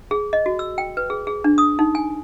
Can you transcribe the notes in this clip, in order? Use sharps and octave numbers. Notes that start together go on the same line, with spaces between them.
G#4
D#5
F#4
E6
G5
B4
G#4
G#4
D4
D#6
D#4
G#5